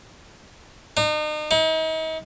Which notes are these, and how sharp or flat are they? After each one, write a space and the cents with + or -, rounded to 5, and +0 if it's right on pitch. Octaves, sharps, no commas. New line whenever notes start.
D#4 -40
D#4 +40